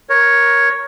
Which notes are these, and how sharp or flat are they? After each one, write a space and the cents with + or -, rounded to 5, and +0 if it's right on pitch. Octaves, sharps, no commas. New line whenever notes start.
A#4 +15 C#5 +0